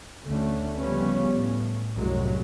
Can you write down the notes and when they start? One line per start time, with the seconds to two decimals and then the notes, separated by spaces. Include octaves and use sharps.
0.25 D2 D3 A3 C#4
0.76 C#3 F3 G3 B3 C#4
1.31 A2
1.94 C2 F#2 A2 F#3 G#3